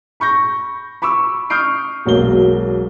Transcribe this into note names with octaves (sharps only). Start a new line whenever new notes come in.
B5 C#6 G6 A#6
B5 C#6 D6 E6
C#6 D#6 F6 G6 C7 D7
E1 B1 F#3 A#3 G7